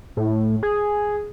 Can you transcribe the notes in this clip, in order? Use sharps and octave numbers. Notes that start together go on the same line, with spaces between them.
A2
G#4